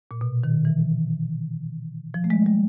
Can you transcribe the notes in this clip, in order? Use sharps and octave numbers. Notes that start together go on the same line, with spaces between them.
A#2
B2
D#3
E3
F3
A3
G#3
G3